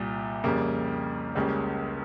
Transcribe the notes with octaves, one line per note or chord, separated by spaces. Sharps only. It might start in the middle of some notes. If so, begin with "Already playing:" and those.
Already playing: C2 A#2 G3
F2 C#3 G3 A#3
C#2 C#3 G3 A#3